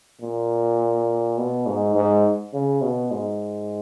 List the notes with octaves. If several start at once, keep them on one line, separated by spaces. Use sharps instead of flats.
A#2
B2
G#2
G#2
C#3
B2
G#2